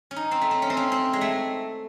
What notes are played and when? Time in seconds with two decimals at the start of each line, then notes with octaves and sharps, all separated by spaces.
0.11 C#4
0.16 D#4
0.31 C4
0.41 A3
0.51 C4
0.62 C#4
0.70 C4
0.77 C#4
0.92 C4
1.13 G#3
1.21 A3